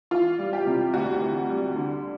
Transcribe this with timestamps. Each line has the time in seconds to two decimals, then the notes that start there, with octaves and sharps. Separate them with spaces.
0.11 E3 F4
0.38 G3
0.53 G4
0.66 C3
0.93 D2 F#4
1.21 E3
1.49 G3
1.76 D3